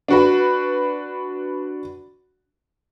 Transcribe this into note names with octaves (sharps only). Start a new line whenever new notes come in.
D4 F#4 B4